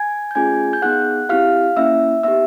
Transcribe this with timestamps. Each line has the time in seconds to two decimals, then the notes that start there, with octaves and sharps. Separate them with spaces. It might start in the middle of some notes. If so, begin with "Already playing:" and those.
Already playing: G#5 G#6
0.31 G6
0.35 A3 C#4 F4 G#4 G#5 G#6
0.73 G6
0.82 B3 D#4 G#4 F#5 F#6
1.29 C4 E4 G4 F5 F6
1.77 A#3 C#4 E4 E5 E6
2.23 B3 D#4 G4 E5 E6